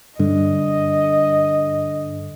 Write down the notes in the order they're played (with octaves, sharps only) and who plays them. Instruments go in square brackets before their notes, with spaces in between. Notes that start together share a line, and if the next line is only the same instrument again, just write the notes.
[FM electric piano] G2 [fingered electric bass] D3 [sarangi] D#5